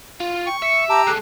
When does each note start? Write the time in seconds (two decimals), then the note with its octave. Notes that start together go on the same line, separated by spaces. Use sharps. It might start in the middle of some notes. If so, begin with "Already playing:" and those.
0.20 F4
0.46 G5 C#6
0.62 E5 C#7
0.89 G4 A5 A#5 D6 E6
1.07 G#3 A4 F#6